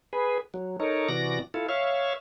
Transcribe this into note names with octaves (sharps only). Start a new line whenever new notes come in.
G#4 B4
F#3
D#4 A4 A#4 C#5
C3 E3 F#4 D5 A#6
E4 F4 A4
C#5 E5 F5